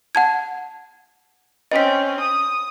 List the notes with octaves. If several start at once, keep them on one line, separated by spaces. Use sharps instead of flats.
F#5 A5 G#6
C4 C#4 D#5 B6
D#6